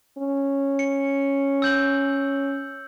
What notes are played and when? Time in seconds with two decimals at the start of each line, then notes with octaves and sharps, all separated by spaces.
0.18 C#4
0.79 C#7
1.62 E6 G6 F#7